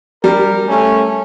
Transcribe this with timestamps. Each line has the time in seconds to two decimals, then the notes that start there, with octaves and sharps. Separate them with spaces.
0.24 G3 A#4
0.68 A3 C#4